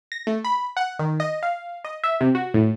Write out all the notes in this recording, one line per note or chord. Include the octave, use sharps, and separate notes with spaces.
A#6
A3
B5
F#5
D#3
D#5
F5
D#5
E5
C3
F#4
A2